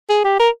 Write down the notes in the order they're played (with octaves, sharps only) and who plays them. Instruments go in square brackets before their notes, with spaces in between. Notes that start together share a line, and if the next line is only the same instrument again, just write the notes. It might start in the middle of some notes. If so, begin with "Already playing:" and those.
[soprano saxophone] G#4
G4
A#4